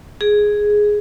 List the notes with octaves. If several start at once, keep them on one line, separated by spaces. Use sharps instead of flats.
G#4